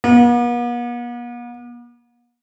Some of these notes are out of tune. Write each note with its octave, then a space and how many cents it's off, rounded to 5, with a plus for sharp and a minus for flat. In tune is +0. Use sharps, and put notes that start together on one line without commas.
B3 -45